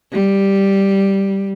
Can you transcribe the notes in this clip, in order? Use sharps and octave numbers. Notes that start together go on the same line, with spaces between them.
G3